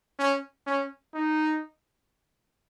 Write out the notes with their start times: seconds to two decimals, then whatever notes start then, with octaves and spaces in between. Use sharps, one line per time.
0.19 C#4
0.67 C#4
1.14 D#4